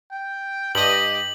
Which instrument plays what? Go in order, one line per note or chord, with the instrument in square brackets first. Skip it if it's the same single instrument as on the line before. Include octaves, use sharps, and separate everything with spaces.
[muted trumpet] G5
[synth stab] G2 D#5 [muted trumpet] G4 [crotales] F#7